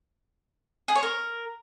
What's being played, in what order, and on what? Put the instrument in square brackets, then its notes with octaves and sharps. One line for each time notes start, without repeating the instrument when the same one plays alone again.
[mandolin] G#4
C#5
A#4